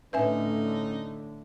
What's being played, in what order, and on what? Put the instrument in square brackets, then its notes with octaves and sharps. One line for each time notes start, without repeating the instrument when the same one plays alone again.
[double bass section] A2 D3 [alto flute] C#4 [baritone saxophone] D#4 [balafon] B4 E5 G#5